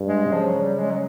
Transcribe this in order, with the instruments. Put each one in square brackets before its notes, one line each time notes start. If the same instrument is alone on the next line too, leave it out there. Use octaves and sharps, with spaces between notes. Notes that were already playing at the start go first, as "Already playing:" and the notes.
Already playing: [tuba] G2
[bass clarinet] G#3
[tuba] C#3
[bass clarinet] F3
F#3
G3
G#3
F#3